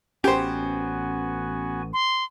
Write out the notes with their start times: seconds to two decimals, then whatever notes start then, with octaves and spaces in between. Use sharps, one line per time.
0.24 A1 B3 C#4 F#4 G4 C5 G#5
1.93 C6